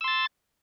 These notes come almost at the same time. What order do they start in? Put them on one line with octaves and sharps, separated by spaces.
E6 C6 A6